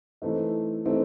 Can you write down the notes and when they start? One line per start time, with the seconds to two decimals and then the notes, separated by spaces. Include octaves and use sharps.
0.22 E3 A3 C4 D#4
0.85 E3 A3 C4 D#4